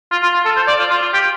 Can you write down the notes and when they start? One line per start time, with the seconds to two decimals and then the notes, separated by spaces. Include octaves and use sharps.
0.12 F4
0.23 F4
0.34 F4
0.45 A4
0.57 C5
0.68 D5
0.79 F4
0.90 F4
1.02 F4
1.13 G4